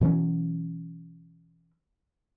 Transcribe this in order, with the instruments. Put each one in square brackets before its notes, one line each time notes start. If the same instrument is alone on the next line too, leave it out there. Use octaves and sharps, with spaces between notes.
[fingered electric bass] B2 E3 F#3 C#4